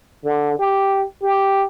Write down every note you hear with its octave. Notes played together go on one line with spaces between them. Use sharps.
D3
G4
G4